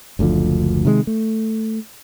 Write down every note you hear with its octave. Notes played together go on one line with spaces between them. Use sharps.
F#1 D2 D3 F3
C3 D#3 F3 G#3
A3